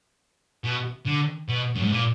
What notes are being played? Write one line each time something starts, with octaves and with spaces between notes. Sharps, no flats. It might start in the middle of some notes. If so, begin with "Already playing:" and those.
B2
D3
B2
F#2
G#2
A#2